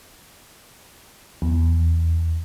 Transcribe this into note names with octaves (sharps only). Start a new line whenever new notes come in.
E2